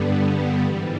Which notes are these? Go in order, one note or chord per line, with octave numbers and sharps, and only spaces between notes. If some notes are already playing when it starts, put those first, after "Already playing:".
Already playing: G2 D3 G3 B3
G#2 E3 G3